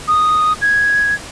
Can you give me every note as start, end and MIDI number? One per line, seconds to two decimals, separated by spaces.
0.08 0.53 87
0.62 1.15 92